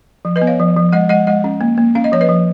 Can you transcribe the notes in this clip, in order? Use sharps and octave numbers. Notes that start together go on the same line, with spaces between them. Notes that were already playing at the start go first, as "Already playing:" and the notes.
F3
B4 D#5
B3
C#5 F5
F3
F3
G#3 D#5 F#5
G#3 D#5 F#5
G#3 D#5 F#5
C#4
A#3
A#3
C#4 F5
D#5
F3 C#5
B4 D#5
F3